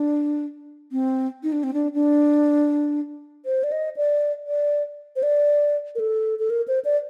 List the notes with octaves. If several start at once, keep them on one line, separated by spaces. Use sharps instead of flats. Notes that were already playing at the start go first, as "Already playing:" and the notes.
Already playing: D4
C4
D#4
D4
C4
D4
D4
C5
D5
D#5
D5
D5
C5
D5
A#4
A4
A4
A#4
C5
D5